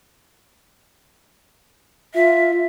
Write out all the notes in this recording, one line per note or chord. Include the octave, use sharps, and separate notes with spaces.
F4 E5